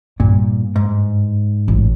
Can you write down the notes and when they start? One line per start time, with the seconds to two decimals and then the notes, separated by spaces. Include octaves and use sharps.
0.20 G2 A#2
0.76 G#2
1.68 A1